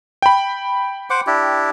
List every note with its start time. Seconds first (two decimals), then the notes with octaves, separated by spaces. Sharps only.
0.22 G5 B5
1.10 C5 F#5 D6
1.27 D4 E4 G4